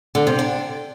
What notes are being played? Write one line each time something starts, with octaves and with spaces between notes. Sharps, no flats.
D3
C3
D4